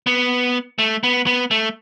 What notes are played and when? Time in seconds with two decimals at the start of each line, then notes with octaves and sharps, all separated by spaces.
0.07 B3
0.79 A3
1.03 B3
1.27 B3
1.51 A3